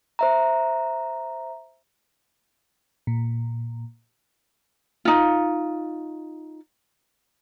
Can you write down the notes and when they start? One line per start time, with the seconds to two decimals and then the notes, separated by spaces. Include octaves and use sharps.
0.19 C5 E5 A#5
3.07 A#2
5.05 D#4 F4